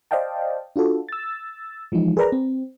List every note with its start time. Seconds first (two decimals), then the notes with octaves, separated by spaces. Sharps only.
0.11 C5 D5 D#5 F5 G5 A5
0.76 D4 F4 F#4 A4
1.09 E6 A6
1.92 E3 F3 G#3 D#4
2.17 G#4 A#4 B4 D5 A#5
2.32 C4